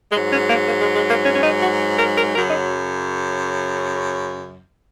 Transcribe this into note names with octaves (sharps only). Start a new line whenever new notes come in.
G#2 F#3 G#3
C#4
A#3
A#3
G#3
G#3
A#3
C#4
C#4
D#4
F#4
A#4
A#4
F#2 C#3 F#3 A#4
D#4